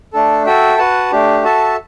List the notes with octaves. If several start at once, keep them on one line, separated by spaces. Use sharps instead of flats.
A3 D4 A4
F#4 A4 E5 G5
F#4 B4 F#5 A5
A3 D4 G4
F#4 A4 E5 A5